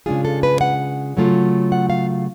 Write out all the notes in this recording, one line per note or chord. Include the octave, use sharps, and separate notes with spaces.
C#3 G#3 D4 F4 G#4
A4
B4
F#5
C#3 F#3 A3 F4
F#5
F5